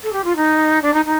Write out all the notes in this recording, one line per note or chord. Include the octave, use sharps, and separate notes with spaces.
A4
G4
F4
D#4
D4
D#4
D#4